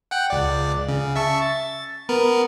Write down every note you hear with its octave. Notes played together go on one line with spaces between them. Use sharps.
F#5 G5 F#6
C#2 D5
C#3
E5 A5 C#6
A6
B3 A#4 B4